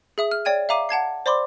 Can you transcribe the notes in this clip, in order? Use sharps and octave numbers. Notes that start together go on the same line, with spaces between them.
G#4 E5 D#6
F6
C#5 D5 G5 G#6 D#7
E5 F5 A#5 D6 D#7
F#5 A5 G#6 C7
C5 D5 B5 C6 D6